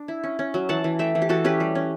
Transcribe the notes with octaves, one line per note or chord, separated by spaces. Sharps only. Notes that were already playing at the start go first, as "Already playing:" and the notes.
Already playing: D4
E4
C#4
C#4
F#3
E3 F#5 A5
E3
A3 E5 G5
E3
G4
E3 F#4 A4
C#4 G4 B4
G3
C#4